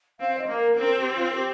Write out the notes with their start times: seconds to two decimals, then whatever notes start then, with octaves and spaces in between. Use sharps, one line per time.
0.19 C4 F5
0.35 C5
0.39 D#5
0.49 A#3
0.59 A#4
0.77 C4 A#4
0.97 G4
1.15 F4
1.30 A#4
1.34 G4